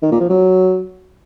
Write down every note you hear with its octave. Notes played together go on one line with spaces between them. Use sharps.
D#3
A#2
F3
F#3